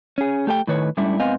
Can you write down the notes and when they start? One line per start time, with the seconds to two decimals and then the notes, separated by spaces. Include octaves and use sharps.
0.18 C#4 G#4
0.47 A3 G4 A4 D5 G5
0.68 A2 D#3 B4 C#5
0.97 G#2 G3 A3 C#4 D4 E4
1.20 G#2 B3 C4 D#5 F5 G#5